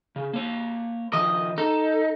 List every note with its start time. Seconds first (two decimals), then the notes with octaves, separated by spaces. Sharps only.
0.16 C#3
0.33 A#3 C#5
1.13 D#3 F3 D#5
1.58 D#4 A4